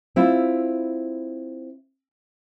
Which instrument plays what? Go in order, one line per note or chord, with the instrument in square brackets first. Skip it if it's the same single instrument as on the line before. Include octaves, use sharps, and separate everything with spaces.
[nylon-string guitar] C4 E4 F4